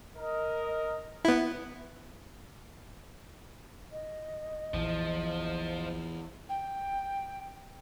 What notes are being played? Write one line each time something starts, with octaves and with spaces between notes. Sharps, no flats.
A#4 D#5
B3 E4
D#5
A#1 E2 E3 F3
G5